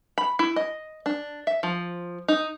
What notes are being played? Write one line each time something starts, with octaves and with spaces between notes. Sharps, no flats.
B5
E4
D#5
D4
E5
F3
D#4